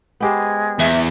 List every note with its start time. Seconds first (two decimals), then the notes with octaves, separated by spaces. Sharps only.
0.20 G#3 B3 G4 C5
0.79 E2 E5